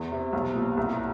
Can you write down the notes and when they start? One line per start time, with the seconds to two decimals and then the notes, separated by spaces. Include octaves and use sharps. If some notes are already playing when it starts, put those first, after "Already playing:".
Already playing: E2
0.12 C3
0.33 B1
0.55 A#2
0.77 C2